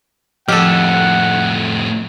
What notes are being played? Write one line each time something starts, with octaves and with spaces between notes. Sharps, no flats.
F2 A2 F3 G4 A4 F#5